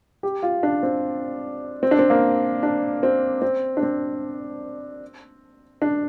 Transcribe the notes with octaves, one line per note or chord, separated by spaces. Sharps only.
G4
F4
D4
C4
C4
D4
C4
A#3
D4
C4
C4
D4
C4
D4